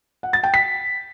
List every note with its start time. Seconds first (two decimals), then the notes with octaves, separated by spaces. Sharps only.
0.23 F#5
0.33 A6
0.43 G5
0.54 B6